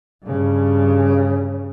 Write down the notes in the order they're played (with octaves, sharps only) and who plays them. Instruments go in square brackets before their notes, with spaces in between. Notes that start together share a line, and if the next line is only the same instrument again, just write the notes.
[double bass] G2 C#3